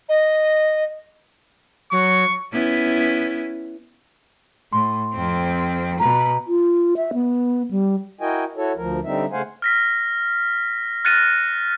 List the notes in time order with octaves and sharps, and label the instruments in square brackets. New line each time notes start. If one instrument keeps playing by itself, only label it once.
[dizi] D#5
[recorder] F#3 [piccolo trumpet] C#6
[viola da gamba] B3 C#4 E4
[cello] A2 [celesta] C6
[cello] F2 C4
[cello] B2 B4 [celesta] A#5
[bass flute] F4
E5
B3
G3
[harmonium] E4 F#4 A#4 D#5 G5 G#5
E4 F#4 A4 C#5
D2 F3 A#4
D3 G3 C4 D#4 E5
C#3 A3 C5 F5 F#5 G#5
[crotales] F6 A#6 B6
F6 F#6 A6 A#6 C#7 D#7